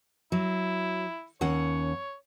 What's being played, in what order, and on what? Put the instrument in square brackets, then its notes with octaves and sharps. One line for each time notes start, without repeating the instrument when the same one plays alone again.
[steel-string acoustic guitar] F#3 [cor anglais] E4
[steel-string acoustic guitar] D#2 C#4 F#5 [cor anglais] C#5